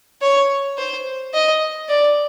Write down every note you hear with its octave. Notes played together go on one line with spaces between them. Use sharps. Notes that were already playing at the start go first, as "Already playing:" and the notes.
C#5
C5
D#5
D5